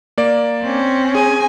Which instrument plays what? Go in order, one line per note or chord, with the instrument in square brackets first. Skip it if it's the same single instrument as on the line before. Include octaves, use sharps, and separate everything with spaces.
[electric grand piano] A#3 D5
[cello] C4 C#4
[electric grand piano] G#4 [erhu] G#5